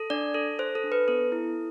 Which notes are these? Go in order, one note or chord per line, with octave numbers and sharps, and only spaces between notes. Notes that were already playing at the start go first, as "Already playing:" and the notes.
Already playing: A4
D4 D5
A4
A4 C5
A4
D4
B4
B3 A4
E4